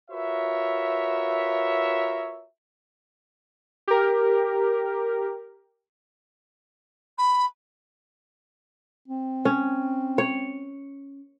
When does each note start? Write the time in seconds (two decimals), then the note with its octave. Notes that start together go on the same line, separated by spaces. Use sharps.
0.11 F4 F#4 A#4 B4 C#5 E5
3.88 G4 A#4
7.18 B5
9.08 C4
9.45 C#4
10.18 C#5